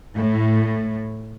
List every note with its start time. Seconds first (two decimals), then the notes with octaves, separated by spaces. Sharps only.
0.17 A2